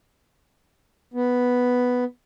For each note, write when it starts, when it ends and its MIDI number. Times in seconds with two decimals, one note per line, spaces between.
1.14 2.04 59